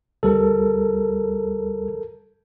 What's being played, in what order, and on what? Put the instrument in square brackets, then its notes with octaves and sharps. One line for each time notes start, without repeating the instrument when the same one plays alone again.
[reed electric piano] D2 G3 [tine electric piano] A4 A#4